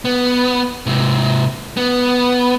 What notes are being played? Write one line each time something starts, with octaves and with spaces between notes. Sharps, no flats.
B3
G#2 C3
B3